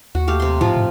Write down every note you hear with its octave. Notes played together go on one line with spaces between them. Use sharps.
D#2 F#4
A3 G4 F5
C3 C6
G#2 F3 F4
G#2